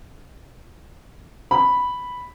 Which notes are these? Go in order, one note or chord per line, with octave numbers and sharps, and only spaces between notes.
B5